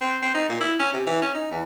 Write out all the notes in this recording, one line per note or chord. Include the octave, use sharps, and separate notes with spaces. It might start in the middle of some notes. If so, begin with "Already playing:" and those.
C4
C4
D#4
A#2
E4
C#4
C3
E3
C#4
D#4
E2